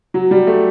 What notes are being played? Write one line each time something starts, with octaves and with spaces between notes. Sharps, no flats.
F#3
G3
A3